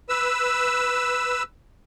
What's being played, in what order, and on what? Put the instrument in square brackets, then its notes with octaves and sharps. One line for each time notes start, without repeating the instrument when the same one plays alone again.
[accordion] B4 E6